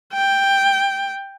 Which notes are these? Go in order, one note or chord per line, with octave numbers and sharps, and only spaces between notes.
G5